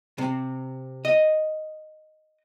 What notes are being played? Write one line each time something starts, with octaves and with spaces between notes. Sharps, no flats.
C3
D#5